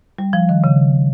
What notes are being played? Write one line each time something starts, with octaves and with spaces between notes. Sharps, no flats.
G3
F3
D#3
C#3